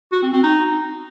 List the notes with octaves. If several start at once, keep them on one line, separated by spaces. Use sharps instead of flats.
F#4
C4
C4
D#4